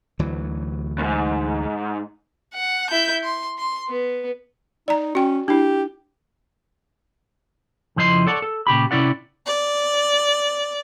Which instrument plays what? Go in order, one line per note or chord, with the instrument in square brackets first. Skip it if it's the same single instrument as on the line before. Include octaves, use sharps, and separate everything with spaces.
[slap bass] D2 E3 F#3
[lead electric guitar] D#2 G#2
[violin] F#5
E4 G6
C6
C6
B3
[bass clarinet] D#4 [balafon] D5 A#5
[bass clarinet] C#4 [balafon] F#4 G5
[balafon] D4 E4 [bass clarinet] G4
[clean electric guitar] F2 C#3 F3 E4 D#5 C6
A4 C#5 D5 F#5 A5
A4
A#2 C#3 G4 B5
C3 C#4 E4 D5 F#5
[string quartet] D5